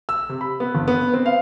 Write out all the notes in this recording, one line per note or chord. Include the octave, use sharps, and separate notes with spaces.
E6
C3
B5
B3
G1
B3
C4
F5